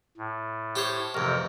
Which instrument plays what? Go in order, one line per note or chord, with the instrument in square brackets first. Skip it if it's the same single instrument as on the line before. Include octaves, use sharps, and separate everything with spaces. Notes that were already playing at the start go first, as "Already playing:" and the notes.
[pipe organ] A2
[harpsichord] G4 C5 C#5
[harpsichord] A1 F2 [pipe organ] C3 A#4